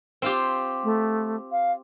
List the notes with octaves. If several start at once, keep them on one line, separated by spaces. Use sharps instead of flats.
C4 F4 G4
A3
F5